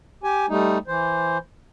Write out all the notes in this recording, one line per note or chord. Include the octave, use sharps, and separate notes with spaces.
G4 G#5
G3 A3 D#4
E3 C5